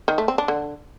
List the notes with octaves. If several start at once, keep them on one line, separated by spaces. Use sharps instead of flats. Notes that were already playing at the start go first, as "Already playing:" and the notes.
D#3
A3
C4
D4
D3